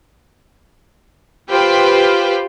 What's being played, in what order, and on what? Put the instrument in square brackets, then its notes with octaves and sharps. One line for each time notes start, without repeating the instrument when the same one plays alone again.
[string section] F4 G4 B4 C5 G5